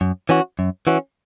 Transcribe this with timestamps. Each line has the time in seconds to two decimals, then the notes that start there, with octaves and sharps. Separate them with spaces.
0.01 F#2
0.29 E3 C#4 F#4
0.59 F#2
0.87 E3 C#4 F#4